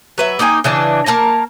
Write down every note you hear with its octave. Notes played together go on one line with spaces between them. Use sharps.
F#3 B4 E5
A#3 D#4 G5 G#5
C#3 E3 D4
A#3 A#4 A5 A#5